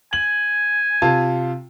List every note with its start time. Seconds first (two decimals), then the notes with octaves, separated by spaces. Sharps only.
0.13 G#5 F#7
1.02 C3 F4 A5